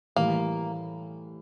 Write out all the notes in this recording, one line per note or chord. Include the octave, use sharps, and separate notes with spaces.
A2 E3 G3 A#3